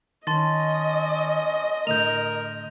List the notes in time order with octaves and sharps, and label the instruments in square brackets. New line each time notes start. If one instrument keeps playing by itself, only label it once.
[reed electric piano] D#3 [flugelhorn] C#4 [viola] D#5 [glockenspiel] A5 C6 A6
[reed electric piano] A2 D3 A3 [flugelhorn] A#4 [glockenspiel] G6 F7